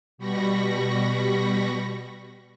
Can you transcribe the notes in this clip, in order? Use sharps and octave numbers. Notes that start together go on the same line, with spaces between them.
B2 G3 B5 C#6 A#6